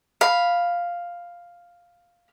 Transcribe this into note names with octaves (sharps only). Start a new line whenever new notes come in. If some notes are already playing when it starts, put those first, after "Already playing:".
F5 B5